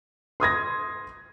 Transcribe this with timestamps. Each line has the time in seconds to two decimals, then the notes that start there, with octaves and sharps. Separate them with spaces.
0.40 C6 D#6 G#6 A#6